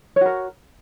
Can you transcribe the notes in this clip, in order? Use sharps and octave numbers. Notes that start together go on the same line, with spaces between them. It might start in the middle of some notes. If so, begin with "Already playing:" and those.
F#4 A#4 C#5